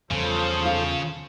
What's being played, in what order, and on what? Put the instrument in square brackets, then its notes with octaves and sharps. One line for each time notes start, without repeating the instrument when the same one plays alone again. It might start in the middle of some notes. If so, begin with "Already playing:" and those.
[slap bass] E2 G3 [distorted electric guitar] C#3 [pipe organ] F3 A4 C5
[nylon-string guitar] F4